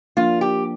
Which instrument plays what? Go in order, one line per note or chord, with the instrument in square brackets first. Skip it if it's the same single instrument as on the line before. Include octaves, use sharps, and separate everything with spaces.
[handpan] F3 A#3 D4 [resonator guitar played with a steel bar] F4
[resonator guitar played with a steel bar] G4